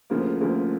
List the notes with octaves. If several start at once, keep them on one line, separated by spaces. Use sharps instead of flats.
D2 C#3 F3 A#3
D2 C#3 F3 A#3